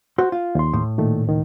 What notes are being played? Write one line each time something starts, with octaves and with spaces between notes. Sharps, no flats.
F#4 C5
F4
D#2 C6
A2
A#2 D#3 A3
C#2 D#3